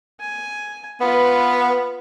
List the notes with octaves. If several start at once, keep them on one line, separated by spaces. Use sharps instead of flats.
G#5
B3 F4 B4